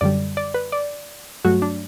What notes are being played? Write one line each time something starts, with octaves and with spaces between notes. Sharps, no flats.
F#2 D3 G3 D5
D5
B4
D5
G2 F#3 A3 F#4
D4